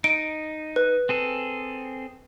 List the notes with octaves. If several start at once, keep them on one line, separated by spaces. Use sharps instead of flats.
D#4 D7
B4
C4 G#4 A4